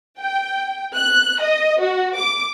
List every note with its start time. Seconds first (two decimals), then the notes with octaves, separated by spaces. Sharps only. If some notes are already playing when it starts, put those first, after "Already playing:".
0.19 G5
0.96 F#6
1.40 D#5
1.81 F#4
2.17 D6